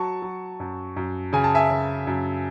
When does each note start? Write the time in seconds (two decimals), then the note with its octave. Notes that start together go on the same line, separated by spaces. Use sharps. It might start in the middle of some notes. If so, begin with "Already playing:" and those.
Already playing: F#3 A5 C#6
0.22 F#3
0.60 F#2
0.97 F#2
1.33 C#3 G#5
1.44 A5
1.55 E5 G#5
1.70 C#3
2.07 F#2